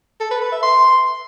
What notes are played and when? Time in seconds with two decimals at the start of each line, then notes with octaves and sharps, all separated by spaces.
0.20 A4
0.31 B4
0.41 B4
0.52 E5
0.63 C6